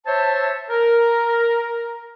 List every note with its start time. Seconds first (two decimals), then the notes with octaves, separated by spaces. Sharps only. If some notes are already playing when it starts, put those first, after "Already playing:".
0.06 C5 C#5 E5 A5
0.70 A#4